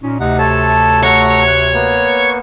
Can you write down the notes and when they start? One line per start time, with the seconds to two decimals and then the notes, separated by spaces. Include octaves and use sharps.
0.02 A#2 C#4 D#4
0.20 D2 C3 D#4 F#5
0.39 A4 C#5 A5
1.03 A3 C#5 F#5 A#5
1.48 F#6
1.73 A#3 B3